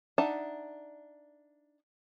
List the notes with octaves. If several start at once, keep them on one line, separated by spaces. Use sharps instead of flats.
D4 D#4 E5 F#5 A5